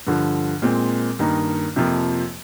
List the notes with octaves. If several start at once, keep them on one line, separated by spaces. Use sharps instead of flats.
G2 D3 F3
A#2 G#3 C4
G2 D#3 A#3 D#4
F2 C3 F3 A#3